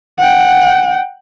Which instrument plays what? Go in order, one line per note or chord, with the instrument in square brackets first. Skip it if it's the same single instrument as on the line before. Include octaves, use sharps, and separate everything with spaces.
[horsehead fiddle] F#5 G5